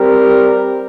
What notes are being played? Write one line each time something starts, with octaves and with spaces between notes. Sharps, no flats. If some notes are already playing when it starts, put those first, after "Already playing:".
Already playing: G3 C4 G4 A#4